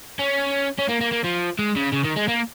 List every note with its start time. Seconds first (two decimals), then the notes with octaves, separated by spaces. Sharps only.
0.19 C#4
0.78 C#4
0.89 A#3
1.01 A#3
1.12 A#3
1.24 F3
1.59 G#3
1.76 C#3
1.93 C#3
2.05 D#3
2.16 G#3
2.28 A#3